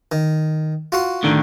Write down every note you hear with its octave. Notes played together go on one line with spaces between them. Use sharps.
D#3
F4 F#4 C6
A2 D3 D#3